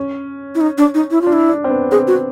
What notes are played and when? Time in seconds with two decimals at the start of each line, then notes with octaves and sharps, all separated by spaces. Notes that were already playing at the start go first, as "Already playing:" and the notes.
Already playing: C#4
0.55 E4
0.61 D#4
0.78 D4
0.94 D#4
1.11 E4
1.22 F4
1.27 D4
1.33 E4
1.49 D4
1.64 C4
1.70 B3
1.91 C4 G#4
2.07 F#4